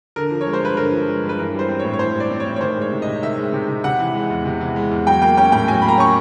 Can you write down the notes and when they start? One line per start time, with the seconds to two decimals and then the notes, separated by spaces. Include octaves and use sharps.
0.16 D3 A#4
0.31 F3
0.41 C#5
0.47 G#3
0.53 C5
0.62 G2 B4
0.77 D3 A#4
0.92 F3
1.08 G#3
1.23 G2
1.29 B4
1.38 E3 A#4
1.54 G3 C5
1.69 C4
1.79 C#5
1.85 A2
1.93 C#5
1.99 E3 C5
2.14 G3
2.20 D5
2.30 C4
2.40 C#5
2.46 A2
2.56 C#5
2.61 D#3 C5
2.77 G#3 C#5
2.92 C3
3.02 C3 D#5
3.22 D#3 E5
3.38 G#3
3.52 C3
3.68 C3
3.84 C3 F#5
3.99 E3
4.14 G#3
4.30 E2
4.45 C3
4.60 E3
4.76 G#3
4.91 E2
5.07 F#3 G5
5.22 A#3 G5
5.37 C#4 G5
5.52 A2 G5
5.68 F#3 G#5
5.82 A#3 B5
5.88 A#5
5.98 C#4 C#6